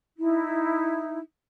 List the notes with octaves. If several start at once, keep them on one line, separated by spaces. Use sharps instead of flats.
D#4 E4 E5